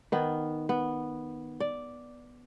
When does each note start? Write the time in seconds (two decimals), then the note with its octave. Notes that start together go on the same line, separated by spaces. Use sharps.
0.12 D#3 B3
0.69 B3
1.60 D5